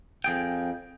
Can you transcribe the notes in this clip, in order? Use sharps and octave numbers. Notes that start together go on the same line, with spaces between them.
F2 G#4 G5